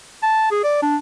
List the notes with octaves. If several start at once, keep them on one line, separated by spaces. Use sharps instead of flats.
A5
G#4
D5
D4